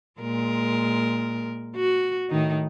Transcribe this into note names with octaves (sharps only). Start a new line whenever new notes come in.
A#2 G#3 A#4
F#4
A2 D#3 D#4